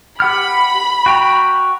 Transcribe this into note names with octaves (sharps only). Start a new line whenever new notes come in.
G4 F#5 B5 F6
F#4 G5 A#5